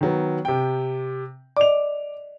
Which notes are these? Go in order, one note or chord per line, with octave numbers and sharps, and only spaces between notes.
D#3 F#3 B3
C3 G5
D5 D#5 D6 F7